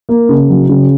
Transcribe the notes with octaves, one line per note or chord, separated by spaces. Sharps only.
A#3
C#3
F#3
C#3